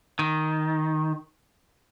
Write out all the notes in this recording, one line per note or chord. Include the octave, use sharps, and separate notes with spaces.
D#3